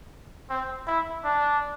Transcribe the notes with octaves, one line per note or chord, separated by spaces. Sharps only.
C4
E4
D4